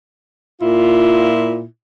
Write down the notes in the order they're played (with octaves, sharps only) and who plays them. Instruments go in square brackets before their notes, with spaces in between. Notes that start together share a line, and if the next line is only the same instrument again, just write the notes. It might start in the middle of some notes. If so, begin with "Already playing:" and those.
[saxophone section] A#2 E4 F4